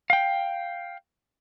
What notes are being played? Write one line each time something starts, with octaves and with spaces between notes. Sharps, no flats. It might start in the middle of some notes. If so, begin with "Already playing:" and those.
F5 G5